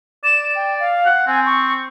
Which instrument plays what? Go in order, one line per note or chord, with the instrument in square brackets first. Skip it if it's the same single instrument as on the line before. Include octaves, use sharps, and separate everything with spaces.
[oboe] D5 [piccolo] E7
[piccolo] G5
F5
[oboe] F#5
[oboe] C4 [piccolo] G#5
[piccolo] C#6